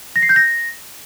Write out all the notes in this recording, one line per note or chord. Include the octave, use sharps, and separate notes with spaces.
A#6
C7
G6
A#6